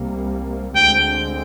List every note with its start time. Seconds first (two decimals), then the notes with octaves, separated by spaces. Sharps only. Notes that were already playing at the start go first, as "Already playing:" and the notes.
Already playing: C2 C3 G3 A#3
0.76 D2 D3 G#3 C4 G5